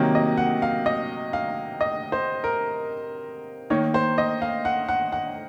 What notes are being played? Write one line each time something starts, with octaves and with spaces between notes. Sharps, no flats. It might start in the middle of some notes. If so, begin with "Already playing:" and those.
Already playing: C3 D#3 F#3 A#3
D#5
F#5
F5
D#5
F5
D#5
C5
A#4
D#3 A#3 D#4 C#5
C5
D#5
F5
F#5
F#5
F#5